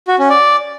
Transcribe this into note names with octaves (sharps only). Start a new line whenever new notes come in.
F#4
C#4
D5